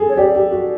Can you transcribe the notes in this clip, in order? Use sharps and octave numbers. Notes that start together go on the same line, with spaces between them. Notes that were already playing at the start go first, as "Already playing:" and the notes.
Already playing: G#4 A4
C#5
G4 D5
G4
F#4